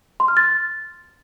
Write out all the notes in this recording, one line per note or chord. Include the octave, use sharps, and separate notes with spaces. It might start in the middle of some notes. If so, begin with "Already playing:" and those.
C6
F6
A6